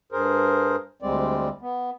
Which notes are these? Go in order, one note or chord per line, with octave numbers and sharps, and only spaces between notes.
G2 G#4 A#4 C5
D2 G3 G#3 C4 D5
B3